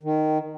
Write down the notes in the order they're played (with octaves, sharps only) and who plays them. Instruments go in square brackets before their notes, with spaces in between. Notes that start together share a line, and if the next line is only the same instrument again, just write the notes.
[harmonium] D#3